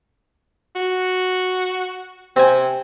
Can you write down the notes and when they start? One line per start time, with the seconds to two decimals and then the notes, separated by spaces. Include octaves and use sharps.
0.76 F#4
2.36 C3 C4 G#5